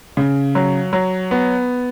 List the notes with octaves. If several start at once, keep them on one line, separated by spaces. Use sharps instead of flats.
C#3
F#3
F#3
B3